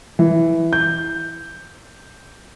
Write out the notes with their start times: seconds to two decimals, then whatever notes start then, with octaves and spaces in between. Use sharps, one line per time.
0.19 E3
0.73 G6